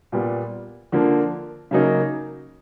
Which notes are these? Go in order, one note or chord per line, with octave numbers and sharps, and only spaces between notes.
A#2 G3 B3
D3 F3 A#3
C#3 F#3 A#3 D#4